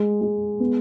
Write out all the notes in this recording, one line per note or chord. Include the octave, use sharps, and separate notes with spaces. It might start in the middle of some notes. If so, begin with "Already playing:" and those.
Already playing: G#3
G#3
B3